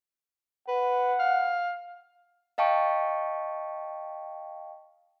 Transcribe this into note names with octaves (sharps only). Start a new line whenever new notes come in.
B4 F#5
F5
D#5 F5 G5 A5 C#6 D7